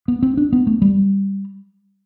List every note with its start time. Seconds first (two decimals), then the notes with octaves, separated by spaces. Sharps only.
0.08 B3
0.23 C4
0.37 D4
0.53 B3
0.67 A3
0.82 G3